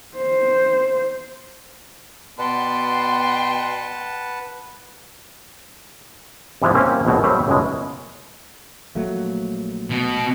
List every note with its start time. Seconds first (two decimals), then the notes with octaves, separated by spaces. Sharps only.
0.16 C5
2.39 B2 B3 B4 D5 F#5 G5 A5 C6
6.62 G2 C3 E3 F3 G#3 B3
6.75 A#3 C4 C#4 G4
7.05 A#1 E2 B2 F#3
7.23 F#3 G3 A3 B4 C5
7.47 C#2 F#2 B2 G#3
8.95 A#1 F#3 A3 A#3
9.90 B2